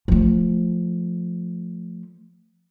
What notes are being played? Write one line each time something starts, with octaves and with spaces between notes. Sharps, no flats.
F3 A3